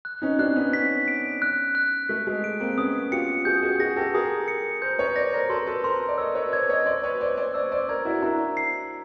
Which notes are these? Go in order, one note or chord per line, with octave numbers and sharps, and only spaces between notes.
F#6
C#4 D#4
C4 D4 F#6
B3 C#4
B6
D7
F#6
F#6
A3 B6
G#3
D7
A#3 C4
B3 C#4 D#6
F4 G4 C#7
F#4 G#4 G6
F#4 G#4
F#4 G#4 A#6
G4 A4
G#4 A#4 D#6
C#7
A#4 C5 G6
B4 C#5
C5 D5 A#6
A#4 C5
A4 B4 C6
A4 B4
A#4 C5 C6
D5
C#5 D#5 E6
B4 C#5
C5 D5 G#6
C#5 D#5
C5 D5 C6
B4 C#5
C5 D5 C6
C5 D5
C5 D5 E6
C5 D5
A#4 C5 G#6
E4 F#4
D4 E4 A#5
C7